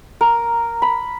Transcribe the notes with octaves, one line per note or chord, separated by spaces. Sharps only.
A#4
B5